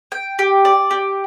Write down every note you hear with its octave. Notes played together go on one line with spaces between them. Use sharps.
G5
G4
D5
G4